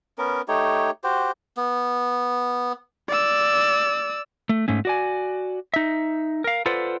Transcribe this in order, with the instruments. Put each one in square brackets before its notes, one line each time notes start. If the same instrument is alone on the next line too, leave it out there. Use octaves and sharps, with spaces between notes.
[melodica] B3 C#4 A#4
A3 D#4 G4 C#5
F#4 G4 C5
B3
[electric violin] D5 E6
[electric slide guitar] A3
G#2 A3 C#4
F#4 D5 G#5
D#4 E5
A#4 F5
F4 A4 B4 C5 D5 F#5